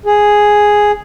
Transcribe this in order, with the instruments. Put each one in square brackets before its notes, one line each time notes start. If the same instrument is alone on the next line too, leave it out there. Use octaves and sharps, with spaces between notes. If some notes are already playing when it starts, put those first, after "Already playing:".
[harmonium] G#4